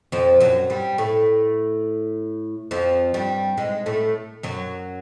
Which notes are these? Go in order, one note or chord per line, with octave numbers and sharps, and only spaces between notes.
F2 F3
F#2 F#3
G2 G3
A2 A3
F2 F3
G2 G3
G#2 G#3
A2 A3
F#2 F#3